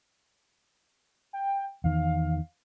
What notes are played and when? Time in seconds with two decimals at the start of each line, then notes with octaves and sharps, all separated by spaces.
1.33 G5
1.84 E2 D#3 F5